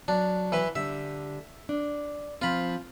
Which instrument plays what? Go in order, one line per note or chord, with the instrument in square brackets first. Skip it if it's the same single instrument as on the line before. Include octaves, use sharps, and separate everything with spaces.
[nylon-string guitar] F#3 [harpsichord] D4
[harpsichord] E3 B4
[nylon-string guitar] D3 G3 [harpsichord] E5
[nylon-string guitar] D4
[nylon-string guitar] F3 C4 [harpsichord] F4 B5